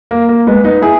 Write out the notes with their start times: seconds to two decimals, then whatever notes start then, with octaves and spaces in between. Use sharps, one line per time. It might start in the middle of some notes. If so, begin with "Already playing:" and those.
0.11 A#3
0.29 A#3
0.47 G#3 B3
0.64 B3 D#4
0.82 E4 G#4